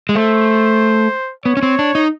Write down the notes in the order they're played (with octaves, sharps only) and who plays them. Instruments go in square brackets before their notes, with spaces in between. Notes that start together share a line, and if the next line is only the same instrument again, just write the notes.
[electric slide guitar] G#3
[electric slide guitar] A3 [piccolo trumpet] C5
[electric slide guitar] B3 [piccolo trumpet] C#5
[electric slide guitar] C#4
C4
D4
D#4